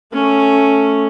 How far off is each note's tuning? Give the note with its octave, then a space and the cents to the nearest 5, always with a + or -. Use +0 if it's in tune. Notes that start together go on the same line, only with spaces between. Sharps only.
A3 +0 C#4 +0